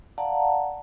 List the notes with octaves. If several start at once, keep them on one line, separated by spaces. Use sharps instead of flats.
D5 F5 F#5 A5 A#5